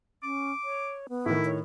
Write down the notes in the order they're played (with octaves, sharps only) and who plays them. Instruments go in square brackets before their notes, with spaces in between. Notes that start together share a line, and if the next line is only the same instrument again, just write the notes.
[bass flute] C#4 [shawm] D6
[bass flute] C#5
B3
[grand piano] A2 D#3 [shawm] E4
[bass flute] C#5